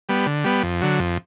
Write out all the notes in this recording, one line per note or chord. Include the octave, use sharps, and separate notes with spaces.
G3 B3
D3
G3 B3
F2
D3 F#3
F2